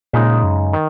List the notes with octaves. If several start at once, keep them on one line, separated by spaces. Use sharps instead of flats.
A#2 C#3 G#3 D#4
F#2
D#3